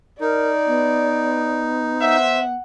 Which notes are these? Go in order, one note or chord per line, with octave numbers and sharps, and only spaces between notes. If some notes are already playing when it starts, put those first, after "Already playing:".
D#4 A#4 D5
B3
C5 E5 F#5